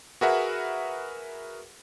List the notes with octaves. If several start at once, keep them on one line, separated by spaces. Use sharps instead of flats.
F#4 G#4 A#4 B4 E5 F#5